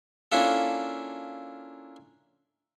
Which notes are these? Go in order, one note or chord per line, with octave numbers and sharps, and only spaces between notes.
A#3 C#4 D4 E4 F4 A4